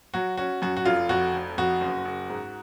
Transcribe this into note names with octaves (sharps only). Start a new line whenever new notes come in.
F#3 F#4
C#4 F#4
F#2 F#4
F#4
F1 F4
F2 F#4
F1
F2 F#4
F#1
F#1
G#2